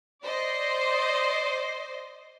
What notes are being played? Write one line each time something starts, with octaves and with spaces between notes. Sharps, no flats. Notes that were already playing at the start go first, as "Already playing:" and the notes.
C5 D5 D#5